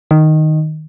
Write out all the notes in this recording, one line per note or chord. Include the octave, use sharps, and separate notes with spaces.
D#3